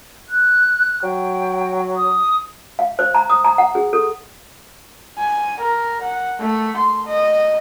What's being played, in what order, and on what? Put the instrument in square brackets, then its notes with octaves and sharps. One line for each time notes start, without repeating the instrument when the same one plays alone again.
[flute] F#6
[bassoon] F#3 [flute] G5
[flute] D#6
[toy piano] F5
C5
A#5
D#6
A#5
F#5
G#4
A4
[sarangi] G#5
A#4
F#5
A3
C6
D#5